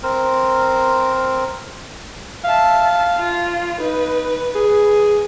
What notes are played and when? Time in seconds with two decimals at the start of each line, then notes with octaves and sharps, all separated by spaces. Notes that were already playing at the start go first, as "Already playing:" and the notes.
0.03 C4 A#4 C5
2.44 E5 F5 A5
3.16 F4
3.80 D#4 B4
4.55 G#4